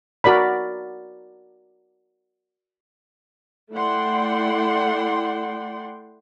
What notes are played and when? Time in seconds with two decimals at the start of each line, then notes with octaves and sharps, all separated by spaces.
0.24 F#4 A#4 D5 B5
3.73 A3 E4 D5 F#5 G5 C6